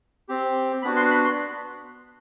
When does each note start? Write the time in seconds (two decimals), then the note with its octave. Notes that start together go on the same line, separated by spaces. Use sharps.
0.29 C4 G4
0.82 B3 D4 F#4 B5
0.96 C6
1.10 B5
1.24 C6